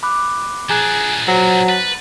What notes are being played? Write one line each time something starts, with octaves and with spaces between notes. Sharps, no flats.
B5 D6 F#6
F3 D4 G#4 A#5 F#6
F#3 C5
B4 A6